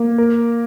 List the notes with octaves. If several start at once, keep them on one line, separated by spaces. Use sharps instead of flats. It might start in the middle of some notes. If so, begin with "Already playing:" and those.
Already playing: A#3
A#4